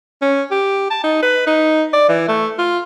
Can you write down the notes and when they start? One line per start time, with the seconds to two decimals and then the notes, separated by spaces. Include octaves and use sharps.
0.22 C#4
0.51 G4
0.91 A5
1.04 D#4
1.22 B4
1.47 D#4
1.93 D5
2.09 E3
2.28 A3
2.58 F4